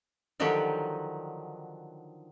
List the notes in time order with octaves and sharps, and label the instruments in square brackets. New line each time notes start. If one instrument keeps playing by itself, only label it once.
[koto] D3 D#3 F3 F#3 D#4 G4